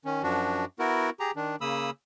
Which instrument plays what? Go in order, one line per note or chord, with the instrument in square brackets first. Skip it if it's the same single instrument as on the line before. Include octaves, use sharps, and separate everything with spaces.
[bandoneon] D#3 C#4
F#2 F3 D4 F#4
B3 E4 F#4 A#4
G4 G#4 A#5
D#3 D4
C#3 A#3 B5 D#6 E6